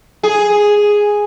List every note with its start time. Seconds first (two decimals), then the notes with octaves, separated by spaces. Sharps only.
0.23 G#4